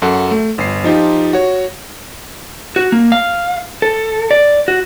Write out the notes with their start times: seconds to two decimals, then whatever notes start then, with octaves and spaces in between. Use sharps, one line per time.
0.02 F#2 F#4 A4 F#5
0.31 A3
0.58 G1 C7
0.84 F3 D#4 F4 G4
1.33 F#4 C#5
2.76 F#4
2.92 A#3
3.12 F5
3.82 A4
4.31 D5
4.68 F#4